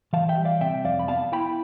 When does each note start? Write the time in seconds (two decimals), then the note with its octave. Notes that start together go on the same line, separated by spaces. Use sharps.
0.13 E3 F5 A5
0.29 E5 G5
0.38 G3
0.45 D5 F5
0.61 C3 E5 G5
0.85 F2 D5 F5
0.99 B5
1.08 B3 F5 A5
1.32 E4 G5 B5